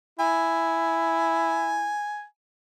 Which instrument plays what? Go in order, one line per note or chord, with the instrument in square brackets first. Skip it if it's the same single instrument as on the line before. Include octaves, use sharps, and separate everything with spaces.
[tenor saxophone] E4 [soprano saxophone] G#5